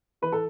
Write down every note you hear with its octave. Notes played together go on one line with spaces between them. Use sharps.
E3 B4
A4